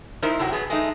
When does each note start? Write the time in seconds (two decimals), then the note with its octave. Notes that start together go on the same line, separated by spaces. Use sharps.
0.22 G#3 D#4 E4 A#4 C5
0.39 A2 C3 F#3 F#4
0.52 F#3 B3 G#4
0.70 G#3 A3 D#4